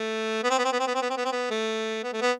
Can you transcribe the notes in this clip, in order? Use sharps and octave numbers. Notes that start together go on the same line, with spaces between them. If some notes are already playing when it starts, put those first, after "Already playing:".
Already playing: A3
B3
C4
B3
C4
B3
C4
B3
C4
B3
C4
B3
C4
B3
A3
B3
A3
B3